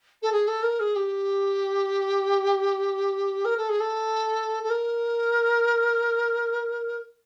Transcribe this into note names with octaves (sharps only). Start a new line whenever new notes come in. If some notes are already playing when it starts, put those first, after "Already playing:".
A4
G#4
A4
A#4
G#4
G4
A#4
A4
G#4
A4
A4
A#4